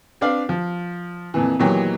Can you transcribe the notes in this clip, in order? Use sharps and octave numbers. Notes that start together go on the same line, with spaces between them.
C4 D4 B4 D5 F5
F3
F2 A#2 E3
A#2 D#3 E3 F#3 B3 G4